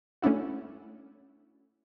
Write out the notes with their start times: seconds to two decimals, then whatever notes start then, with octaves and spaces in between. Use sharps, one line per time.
0.22 A3 C#4 D4 E4 F#4